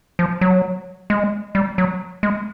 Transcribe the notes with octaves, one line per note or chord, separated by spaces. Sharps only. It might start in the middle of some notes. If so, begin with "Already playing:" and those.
F3
F#3
G#3
G3
F#3
G#3